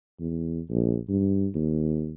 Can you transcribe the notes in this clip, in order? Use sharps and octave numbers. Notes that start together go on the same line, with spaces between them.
E2
A#1
G2
D#2